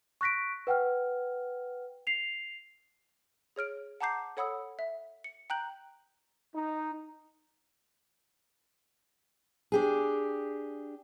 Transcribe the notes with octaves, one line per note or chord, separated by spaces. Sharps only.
C#6 F#6 A#6 B6 D7
B4 F#5 G5 F6
C7 F7
G#4 C#5 F6 D7
F#5 A5 A#5 D6 G6 C7
A4 C#5 F#5 B5 D#6 E6
E5
C#7
G5 A#5 F#6 G6 F#7
D#4
D4 G4 G#4